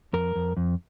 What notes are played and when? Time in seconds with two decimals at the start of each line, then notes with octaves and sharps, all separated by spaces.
0.13 F2 A#4
0.35 F2
0.57 F2